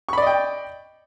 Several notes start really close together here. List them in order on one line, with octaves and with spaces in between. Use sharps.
C#6 B5 D5 D#5 G5